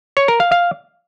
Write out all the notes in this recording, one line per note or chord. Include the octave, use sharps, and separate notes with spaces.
C#5
A#4
F5
F5